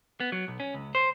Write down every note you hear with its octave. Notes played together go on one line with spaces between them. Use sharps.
B3
F#3
B1
C#4
C#2
C5